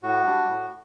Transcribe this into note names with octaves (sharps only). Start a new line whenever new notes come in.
A2 F#4
G3 D4
A2